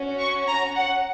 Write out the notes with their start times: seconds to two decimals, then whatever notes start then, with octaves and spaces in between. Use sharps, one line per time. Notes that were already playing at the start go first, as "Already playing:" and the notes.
Already playing: C#4 F#4
0.19 C#6
0.48 A#5
0.76 F#5